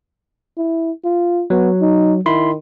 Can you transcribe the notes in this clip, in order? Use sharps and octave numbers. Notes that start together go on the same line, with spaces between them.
E4
F4
F#3 B3
D#4
D#3 E4 B5 C6